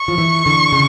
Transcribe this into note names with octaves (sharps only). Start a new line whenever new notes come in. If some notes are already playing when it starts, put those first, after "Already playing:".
Already playing: C#6
F3
E3
D3
C#3